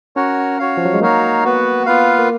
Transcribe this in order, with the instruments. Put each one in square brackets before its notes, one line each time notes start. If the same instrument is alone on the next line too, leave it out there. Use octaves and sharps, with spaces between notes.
[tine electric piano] C#4 [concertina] F#4 A#4 C#5 F#5
[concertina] F#4 C#5 F5
[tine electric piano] F3
F#3
G#3
[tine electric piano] A#3 [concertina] D#4 F#4 A#4 C#5 F5
[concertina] B3 F#4 B4
B3 F4 B4 F5
[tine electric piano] A#3